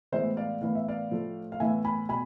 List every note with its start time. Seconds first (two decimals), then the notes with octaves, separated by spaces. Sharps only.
0.12 A2 E3 G#3 B3 C5 E5
0.37 D5 F5
0.61 A2 E3 B3 F5
0.75 E5
0.88 D5 F5
1.11 A2 F3 A3
1.52 F5
1.60 A2 E3 B3 E5 G#5
1.85 G#5 B5
2.09 B2 G#5 B5